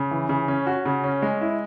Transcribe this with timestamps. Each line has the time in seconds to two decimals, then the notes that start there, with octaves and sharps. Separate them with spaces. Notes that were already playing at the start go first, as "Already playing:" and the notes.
Already playing: C#3
0.11 E3
0.29 C#3
0.48 C#4
0.67 F#4
0.85 C#3
1.04 C#4
1.22 G#3
1.41 E4